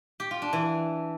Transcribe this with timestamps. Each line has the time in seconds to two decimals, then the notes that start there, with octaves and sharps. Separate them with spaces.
0.20 G4
0.31 F4
0.42 D4
0.53 E3